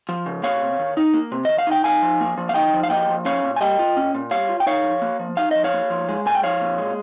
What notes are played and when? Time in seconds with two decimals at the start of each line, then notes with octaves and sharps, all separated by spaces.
0.09 F3
0.26 C#3
0.43 A#3 C#5 F5
0.62 C3
0.79 D#3
0.97 D#4
1.14 A#3
1.32 C3
1.45 D#3 D#5
1.58 F5
1.67 D#4 G5
1.84 D#4 F5 G#5
2.02 F3
2.21 A#3
2.38 F3
2.49 F5
2.54 D#4 D#5 G5
2.73 F3
2.83 F5
2.90 A#3 D#5 G5
3.09 F3
3.25 C#4 C#5 F5
3.43 A#2
3.56 G#5
3.60 G3 D#5 G5
3.79 F4
3.97 C#4
4.14 A#2
4.31 G3 C#5 F5
4.49 F4
4.60 G5
4.66 D#4 C#5 F5
4.84 F3
5.02 A#3
5.19 F3
5.37 D#4 F5
5.51 F3 D#5
5.64 C#5 F5
5.73 A#3
5.90 F3
6.09 G#3
6.26 A#2 G#5
6.35 G5
6.43 F3 C#5 F5
6.61 A#2
6.78 G#3